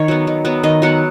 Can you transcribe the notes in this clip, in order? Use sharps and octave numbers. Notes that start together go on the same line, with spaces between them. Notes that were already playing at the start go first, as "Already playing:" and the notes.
Already playing: D#3 C#5
F#3 B3
D#3
F#3 B3
D#3 D#5
F#3 B3 F#5